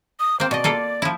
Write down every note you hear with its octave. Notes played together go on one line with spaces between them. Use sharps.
D#6
A#3 C4 C5
B2 D5 D#5
A#3 F4 A4
F3 E4